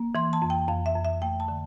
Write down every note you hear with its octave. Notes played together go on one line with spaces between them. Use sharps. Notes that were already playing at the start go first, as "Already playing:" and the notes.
Already playing: A#3
E3 C6
A5
F2
G5
F2 F5
E5
F2
E5
A3 G5
A5
D3